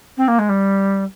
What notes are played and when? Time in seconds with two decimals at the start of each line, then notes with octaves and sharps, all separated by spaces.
0.17 C4
0.28 A#3
0.39 G#3
0.49 G3